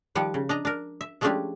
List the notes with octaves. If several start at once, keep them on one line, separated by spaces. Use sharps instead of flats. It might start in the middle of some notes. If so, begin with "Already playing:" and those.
D#3 F3 G3 F#5
C#3
D4 D#5 A#5
D4 A#4
E5
F3 G#3 A3 C#4 D4 G4